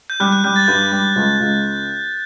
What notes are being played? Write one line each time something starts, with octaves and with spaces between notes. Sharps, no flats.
G6
G3 F#6
F#6
G3 G6
A6
G2 G6
G3
C#2
C#2